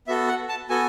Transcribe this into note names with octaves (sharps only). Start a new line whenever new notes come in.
B3 F#4 A4 E5
F#5
A5
B3 F#4 A4 G#5